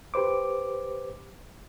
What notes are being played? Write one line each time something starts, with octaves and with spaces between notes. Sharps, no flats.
G4 B4 C5 D6